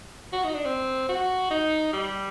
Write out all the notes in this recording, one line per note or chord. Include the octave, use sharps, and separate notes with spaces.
F#4
D#4
D4
C4
F#4
D#4
G3